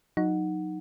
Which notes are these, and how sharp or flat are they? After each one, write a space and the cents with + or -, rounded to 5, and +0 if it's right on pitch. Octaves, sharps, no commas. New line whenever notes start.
F#3 -25 D#4 +0 F#5 +0